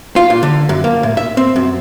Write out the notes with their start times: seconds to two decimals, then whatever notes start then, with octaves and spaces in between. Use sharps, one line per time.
0.16 F4
0.30 A#2
0.43 D3
0.69 F#2
0.84 A#3
1.03 A2
1.17 E5
1.37 C4
1.56 F#2